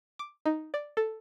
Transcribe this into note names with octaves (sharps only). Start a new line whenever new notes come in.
D6
D#4
D5
A4